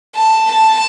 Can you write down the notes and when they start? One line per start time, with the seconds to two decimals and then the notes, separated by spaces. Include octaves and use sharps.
0.16 A5
0.52 A5